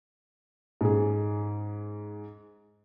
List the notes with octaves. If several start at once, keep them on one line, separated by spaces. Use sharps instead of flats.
G#2 C#4 G#4